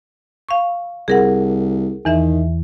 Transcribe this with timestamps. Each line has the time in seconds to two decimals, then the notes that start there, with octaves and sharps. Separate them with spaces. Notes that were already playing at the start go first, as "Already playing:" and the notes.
0.49 F5 C#6
1.08 C2 G#4 A#4 F#5
2.05 E2 D#3 E3 E5